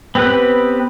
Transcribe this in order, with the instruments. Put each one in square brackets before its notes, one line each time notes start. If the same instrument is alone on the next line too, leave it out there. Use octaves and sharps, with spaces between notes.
[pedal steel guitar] B3 C4 G4 B4 F#6